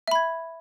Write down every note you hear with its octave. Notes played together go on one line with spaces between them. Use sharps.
E5 B5 G#6